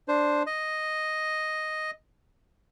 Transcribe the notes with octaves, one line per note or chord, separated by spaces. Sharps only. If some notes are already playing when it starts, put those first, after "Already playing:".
D4 C5
D#5